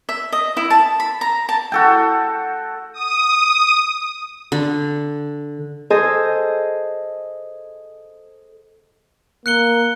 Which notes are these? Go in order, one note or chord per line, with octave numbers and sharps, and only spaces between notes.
E5
D#5
E4
A5
B5
A#5
A5
F#4 A4 G5
D#6
D3
G#4 A4 C5 D#5 G#5
A#3 F#6 C#7 G7